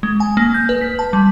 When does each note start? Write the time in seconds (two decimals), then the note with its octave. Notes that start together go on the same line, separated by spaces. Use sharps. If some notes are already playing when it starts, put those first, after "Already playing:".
0.03 G#3
0.20 G#5
0.37 A#3
0.54 G6
0.69 B4
0.81 B6
0.99 A5
1.13 G3